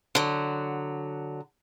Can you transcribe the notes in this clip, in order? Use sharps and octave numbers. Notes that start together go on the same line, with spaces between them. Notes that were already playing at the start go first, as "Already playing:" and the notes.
D3 F#3